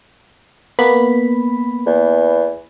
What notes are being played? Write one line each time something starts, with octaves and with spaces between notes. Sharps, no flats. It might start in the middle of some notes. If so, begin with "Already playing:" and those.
A#3 B3 B5
E2